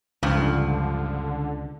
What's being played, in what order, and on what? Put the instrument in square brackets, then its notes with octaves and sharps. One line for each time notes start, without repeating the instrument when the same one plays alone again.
[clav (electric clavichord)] C#2 [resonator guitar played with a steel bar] G2 F3 [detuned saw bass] D3